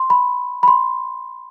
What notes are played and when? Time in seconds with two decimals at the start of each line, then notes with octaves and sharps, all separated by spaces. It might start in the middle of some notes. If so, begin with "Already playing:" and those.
Already playing: C6
0.10 B5
0.63 B5
0.68 C6